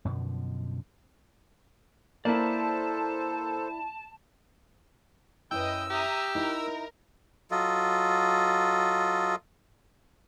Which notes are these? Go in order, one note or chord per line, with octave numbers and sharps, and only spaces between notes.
F#2 B2 D3 F3
A#3 E4 A4 C5 D5 A5
F#2 E4 B4 D#5 G5 E6
G4 E5 A#5 D#6
D#4 E4 A#4
F#3 F4 A4 D#5